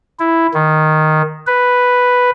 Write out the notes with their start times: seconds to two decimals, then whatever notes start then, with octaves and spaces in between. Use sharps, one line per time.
0.20 E4
0.54 D#3
1.47 B4